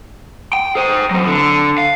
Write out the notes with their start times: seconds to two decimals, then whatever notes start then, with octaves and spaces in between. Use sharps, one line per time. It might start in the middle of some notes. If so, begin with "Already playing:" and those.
0.53 G5
0.75 G#4 C5
1.11 F#3 C4
1.26 D3
1.78 F5